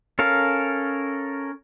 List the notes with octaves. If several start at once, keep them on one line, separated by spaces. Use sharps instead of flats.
C#4 A4 A#4 F5